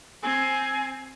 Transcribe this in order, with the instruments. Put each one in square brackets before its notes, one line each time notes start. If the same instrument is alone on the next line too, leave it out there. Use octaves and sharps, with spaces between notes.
[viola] C4 [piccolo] G#5